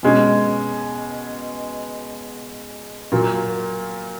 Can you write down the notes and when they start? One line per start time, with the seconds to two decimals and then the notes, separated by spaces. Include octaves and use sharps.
0.03 B2 G#3 C#4
3.12 A#2 F#3 A#3